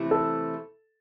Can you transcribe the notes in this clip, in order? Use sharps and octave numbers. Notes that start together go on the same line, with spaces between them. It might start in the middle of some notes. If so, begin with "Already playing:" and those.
Already playing: C3 E3 A3 E4
A4